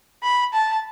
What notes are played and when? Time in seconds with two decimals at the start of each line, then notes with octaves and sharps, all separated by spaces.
0.23 B5
0.53 A5